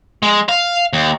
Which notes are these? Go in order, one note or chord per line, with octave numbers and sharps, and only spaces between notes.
G#3
F5
D#2